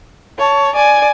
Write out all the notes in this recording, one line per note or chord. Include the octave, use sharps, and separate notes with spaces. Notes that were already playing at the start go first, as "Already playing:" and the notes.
C#5 A5
D5 G#5